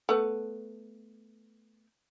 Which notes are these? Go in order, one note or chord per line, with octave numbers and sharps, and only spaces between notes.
A3 B3